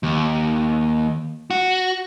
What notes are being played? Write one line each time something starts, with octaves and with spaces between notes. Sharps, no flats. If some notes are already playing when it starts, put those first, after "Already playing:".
D#2
F#4